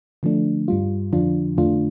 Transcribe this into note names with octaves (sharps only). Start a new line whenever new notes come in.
D3 F3 A3 D4
G2 G3 F4
F2 D3 F3 D4 F4
F2 D3 A3 D4 F4